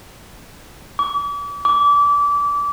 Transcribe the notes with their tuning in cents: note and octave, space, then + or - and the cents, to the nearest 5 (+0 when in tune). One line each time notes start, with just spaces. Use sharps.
D6 -40
D6 -25